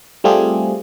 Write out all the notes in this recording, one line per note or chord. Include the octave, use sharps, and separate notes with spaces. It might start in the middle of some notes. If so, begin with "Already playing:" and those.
G3 A3 C4 F4 G4 G#4